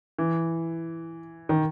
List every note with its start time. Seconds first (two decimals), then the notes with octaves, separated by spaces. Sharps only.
0.19 E3
1.49 D#3